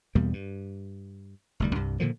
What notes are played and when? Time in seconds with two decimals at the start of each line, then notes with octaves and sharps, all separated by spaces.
0.15 E2 B2 G3 A#3
0.33 G2
1.60 F1 D2 G3
1.75 C2 G2
2.00 A#2 D3 D#3 F3